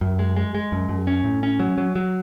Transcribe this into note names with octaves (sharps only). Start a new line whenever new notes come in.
F#2
G#3
G#3
G#3
F#2
F#2
C#4
A2
C#4
F#3
F#3
F#3